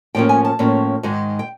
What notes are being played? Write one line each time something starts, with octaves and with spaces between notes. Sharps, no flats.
A2 F3 A#3 C#4 G5
G#5
A5
A2 F3 A#3 C#4
G#2 D#3 G#3
G5